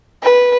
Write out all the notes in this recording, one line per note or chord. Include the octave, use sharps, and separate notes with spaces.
B4